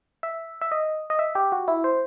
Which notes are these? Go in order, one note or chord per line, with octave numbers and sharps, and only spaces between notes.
E5
E5
D#5
D#5
E5
G4
F#4
E4
C5